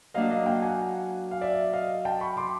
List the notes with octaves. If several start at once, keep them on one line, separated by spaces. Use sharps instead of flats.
F#3 A#3 D4 F#4 D#5 F5
D#5 F5
F5 G5
F#5 G#5
F5
D5 E5
D#5 F5
G5 A5
B5 C#6
C6 D6